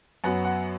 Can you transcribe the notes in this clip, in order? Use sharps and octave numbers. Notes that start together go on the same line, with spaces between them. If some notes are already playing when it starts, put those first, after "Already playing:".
F#2 F#3 B3 F#5
F#5